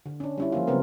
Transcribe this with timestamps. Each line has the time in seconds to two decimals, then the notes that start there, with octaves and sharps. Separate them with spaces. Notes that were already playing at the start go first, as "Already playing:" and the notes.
0.06 D3
0.20 C#4 D4
0.38 G3 C#4 E4
0.52 F3 A#3 F4
0.67 C#3 F#3 G3 B3 C4 A#4